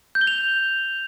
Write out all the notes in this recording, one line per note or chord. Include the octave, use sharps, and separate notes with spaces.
G6
G7
F7